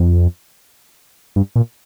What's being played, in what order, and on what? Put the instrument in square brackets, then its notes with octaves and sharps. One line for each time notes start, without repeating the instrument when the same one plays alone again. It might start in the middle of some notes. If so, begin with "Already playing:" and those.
Already playing: [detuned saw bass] F2
G2
A#2